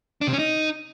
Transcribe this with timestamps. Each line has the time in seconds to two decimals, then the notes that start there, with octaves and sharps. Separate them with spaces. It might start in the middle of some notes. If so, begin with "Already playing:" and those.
0.21 D4
0.27 C3
0.33 C#4
0.39 D#4